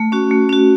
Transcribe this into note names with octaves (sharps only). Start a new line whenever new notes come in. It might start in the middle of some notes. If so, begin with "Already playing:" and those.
Already playing: A3
C#4 F#4
A3
C#4 F#4